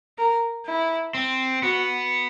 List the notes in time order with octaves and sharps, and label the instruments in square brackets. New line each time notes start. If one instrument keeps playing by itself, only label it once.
[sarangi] A#4
E4
[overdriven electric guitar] C4
[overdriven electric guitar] B3 [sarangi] F#4